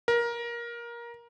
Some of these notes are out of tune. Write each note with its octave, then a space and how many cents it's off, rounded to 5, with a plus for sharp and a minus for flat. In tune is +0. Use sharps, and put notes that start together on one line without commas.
A#4 +20